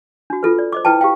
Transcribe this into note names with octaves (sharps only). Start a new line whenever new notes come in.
D4 F#4
F4 A4 B4
D5
C5 D#5 D6
E4 B4 G5 A5
G4 F5 G5